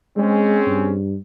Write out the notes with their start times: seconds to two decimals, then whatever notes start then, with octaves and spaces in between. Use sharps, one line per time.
0.18 G#3 C4 C#4 G#4
0.67 G2